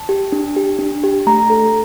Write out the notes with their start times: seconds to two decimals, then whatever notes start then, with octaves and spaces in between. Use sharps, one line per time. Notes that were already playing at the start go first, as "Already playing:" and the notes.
Already playing: A5
0.09 G4
0.32 D4
0.56 G4
0.79 D4
1.04 G4
1.27 A3 A#5
1.50 A4